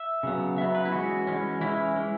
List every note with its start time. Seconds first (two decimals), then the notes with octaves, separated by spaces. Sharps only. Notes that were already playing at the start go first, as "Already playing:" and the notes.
Already playing: E5
0.23 C#3 F#3 B3
0.57 C#3 F#3 B3 E5
0.75 B4
0.85 E4
0.92 E3 G#3 C#4 F#4
1.27 E3 G#3 C#4
1.61 E3 G#3 C#4 E4
1.96 E3 G#3 C#4